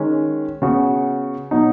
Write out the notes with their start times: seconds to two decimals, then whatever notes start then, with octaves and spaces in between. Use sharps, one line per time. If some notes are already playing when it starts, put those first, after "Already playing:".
Already playing: D#3 G#3 C#4
0.62 C#3 B3 F#4
1.51 B2 F#3 D#4